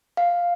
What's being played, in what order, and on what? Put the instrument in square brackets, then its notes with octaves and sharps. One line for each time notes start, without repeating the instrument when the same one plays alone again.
[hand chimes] F5